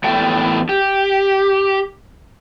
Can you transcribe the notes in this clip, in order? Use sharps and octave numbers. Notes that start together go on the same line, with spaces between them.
E2 A2 A4 G5
G4